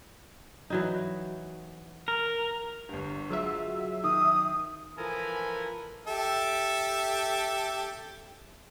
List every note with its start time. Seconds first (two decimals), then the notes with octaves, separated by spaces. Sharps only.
0.70 E3 F#3 D#4
2.08 A#4
2.89 G1 G2
3.30 F#3 G#3 F4 E5
4.04 D#3 D#6
4.97 E3 F3 A4 A#4 G#5 B5
6.07 G4 A4 E5